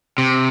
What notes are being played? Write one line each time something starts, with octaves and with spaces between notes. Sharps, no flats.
C3